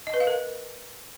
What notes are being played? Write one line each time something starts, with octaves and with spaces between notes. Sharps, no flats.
D#5
B4
F5
A#4